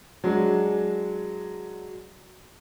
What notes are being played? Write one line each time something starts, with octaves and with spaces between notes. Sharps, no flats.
F#3 G#3 D4